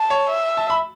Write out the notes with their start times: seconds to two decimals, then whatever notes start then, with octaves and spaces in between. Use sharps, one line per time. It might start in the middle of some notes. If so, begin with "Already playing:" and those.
Already playing: A5
0.10 C#5
0.30 E5
0.57 A5
0.70 B5